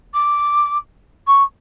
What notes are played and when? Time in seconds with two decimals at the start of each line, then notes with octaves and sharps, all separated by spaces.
0.14 D6
1.27 C#6